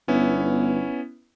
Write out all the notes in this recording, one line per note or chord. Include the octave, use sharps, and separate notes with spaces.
G1 B3 C#4 E4